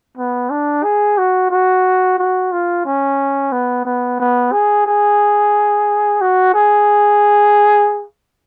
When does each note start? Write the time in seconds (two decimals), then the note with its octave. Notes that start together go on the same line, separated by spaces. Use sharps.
0.17 B3
0.50 D4
0.84 G#4
1.18 F#4
1.51 F#4
2.18 F#4
2.52 F4
2.86 C#4
3.52 B3
3.85 B3
4.20 B3
4.52 G#4
4.87 G#4
6.21 F#4
6.54 G#4